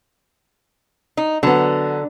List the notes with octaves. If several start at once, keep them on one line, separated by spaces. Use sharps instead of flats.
D#4
D3 F#3 B3